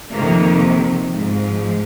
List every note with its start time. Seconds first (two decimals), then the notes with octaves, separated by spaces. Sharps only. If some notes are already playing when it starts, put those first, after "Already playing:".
0.12 F2 C3 D#3 A#3
1.13 G#2 F3